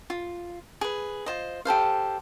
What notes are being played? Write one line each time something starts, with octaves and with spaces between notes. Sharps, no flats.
F4
G#4 B4
F4 C5 D#5
G4 A4 C5 F5